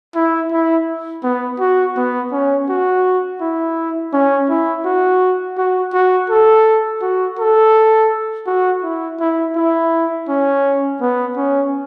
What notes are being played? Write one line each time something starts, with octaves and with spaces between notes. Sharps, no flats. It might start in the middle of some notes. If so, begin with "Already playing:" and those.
E4
E4
B3
F#4
B3
C#4
F#4
E4
C#4
E4
F#4
F#4
F#4
A4
F#4
A4
F#4
E4
E4
E4
C#4
B3
C#4